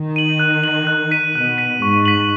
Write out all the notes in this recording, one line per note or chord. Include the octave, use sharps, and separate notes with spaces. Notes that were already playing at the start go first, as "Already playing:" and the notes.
Already playing: D#3
D#7 F#7
F#6
D#7 F#7
F#6
B6 D#7
B2 F#6
B6 D#7
G#2 C#6
B6 F#7